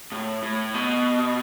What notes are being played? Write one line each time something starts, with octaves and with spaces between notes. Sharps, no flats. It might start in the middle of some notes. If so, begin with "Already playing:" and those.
A2
A2
B2